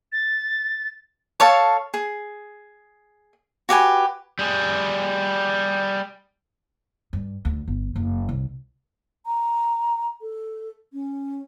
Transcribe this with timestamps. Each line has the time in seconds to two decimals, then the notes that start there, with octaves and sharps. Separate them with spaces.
0.12 A6
1.40 A4 C#5 F5 A5
1.94 G#4
3.69 F#4 G4 B4 G#5
4.39 G3 G#4
7.13 G2
7.45 D2
7.68 G1
7.96 F#1
8.29 C2
9.26 A#5
10.21 A4
10.93 C#4